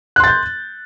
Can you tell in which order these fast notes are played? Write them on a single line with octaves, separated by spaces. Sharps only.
F#6 C6 A6 G6